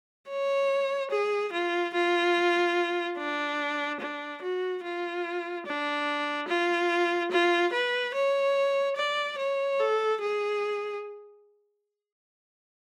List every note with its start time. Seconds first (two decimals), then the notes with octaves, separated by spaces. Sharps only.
0.29 C#5
1.11 G#4
1.52 F4
1.94 F4
3.18 D4
4.00 D4
4.42 F#4
4.84 F4
5.66 D4
6.48 F4
7.31 F4
7.73 B4
8.14 C#5
8.96 D5
9.39 C#5
9.79 A4
10.21 G#4